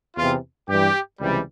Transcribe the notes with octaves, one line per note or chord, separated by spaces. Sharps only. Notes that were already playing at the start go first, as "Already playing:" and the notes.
E2 C3 E3 F4
G2 E3 G3 G4
C#2 C3 E3 G3